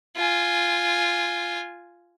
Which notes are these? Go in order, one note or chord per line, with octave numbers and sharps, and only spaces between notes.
F4 G#5